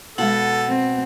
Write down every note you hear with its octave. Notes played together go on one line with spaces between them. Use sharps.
B2 G#3 A4 F5 F#5 B5
C4